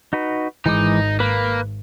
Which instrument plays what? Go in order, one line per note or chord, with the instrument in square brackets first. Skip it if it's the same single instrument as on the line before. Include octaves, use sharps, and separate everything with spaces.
[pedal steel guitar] D#4 F#4 B4
[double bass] G#1 [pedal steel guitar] E3 G#3 D6 [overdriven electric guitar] D#4
[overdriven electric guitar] A#3 [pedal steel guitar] B4 B5